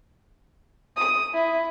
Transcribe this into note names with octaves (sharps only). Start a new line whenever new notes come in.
D#6
E4